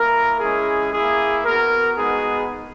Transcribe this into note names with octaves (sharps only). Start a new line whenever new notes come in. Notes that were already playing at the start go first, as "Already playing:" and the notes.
Already playing: A#3 E4 A#4
G#3 C#4 E4 G#4
A#3 E4 G#4
B3 F#4 A#4
G#3 B3 D#4 F#4 G#4